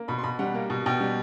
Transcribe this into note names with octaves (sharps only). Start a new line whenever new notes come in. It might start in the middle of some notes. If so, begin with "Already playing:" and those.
Already playing: A#3
B2 B5
C6
B2 B5
G3 F#5
A#3
B2
B2 G5
G3